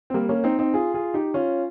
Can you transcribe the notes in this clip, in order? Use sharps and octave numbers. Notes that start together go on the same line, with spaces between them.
C4
G3 A#3
A#3 C#4
C4 D#4
C4 D#4
F4 G#4
F4 G#4
D#4 G4
C#4 F4